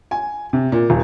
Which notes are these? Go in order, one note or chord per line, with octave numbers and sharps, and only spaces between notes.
G#5
C3
A#2
D#1